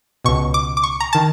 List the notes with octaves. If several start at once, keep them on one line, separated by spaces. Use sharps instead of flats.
C#2 B2 C#6
D6
D6
C#6
A#5
D#3 A5